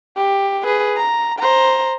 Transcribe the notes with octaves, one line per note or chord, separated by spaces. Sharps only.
G4
G#4 B4
A#5
C5 A#5